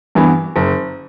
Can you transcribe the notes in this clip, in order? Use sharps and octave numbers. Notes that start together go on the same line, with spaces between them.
G2 E3 B3
F#1